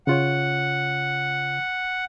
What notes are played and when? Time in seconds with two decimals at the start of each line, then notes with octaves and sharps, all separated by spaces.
0.07 C#3 F4 C#5 F#5